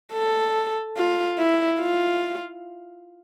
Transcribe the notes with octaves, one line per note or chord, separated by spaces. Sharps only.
A4
F4
E4
F4